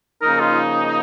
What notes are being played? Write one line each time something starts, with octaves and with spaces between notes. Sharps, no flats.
C#3 F3 A#3 D#4 A#4
F4